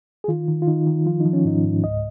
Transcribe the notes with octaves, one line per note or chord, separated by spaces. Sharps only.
G#4
D#3 F4
D#3
F4
D#3 D#4
D#3
F3 F4
F3 D#4
C#4
G#2 D#4
G#2
C#2 D#5